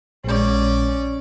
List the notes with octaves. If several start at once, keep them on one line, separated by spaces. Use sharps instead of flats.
A#1 G#3 C#4 D5